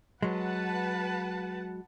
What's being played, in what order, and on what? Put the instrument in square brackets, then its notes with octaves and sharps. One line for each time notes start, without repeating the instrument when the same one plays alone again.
[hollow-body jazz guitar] F#3 G#3 [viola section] B4 F#5 A5